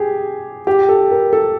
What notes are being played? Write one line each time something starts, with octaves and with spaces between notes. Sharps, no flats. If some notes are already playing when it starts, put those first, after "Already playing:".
Already playing: G4 G#4
G4
A4
A#4
A4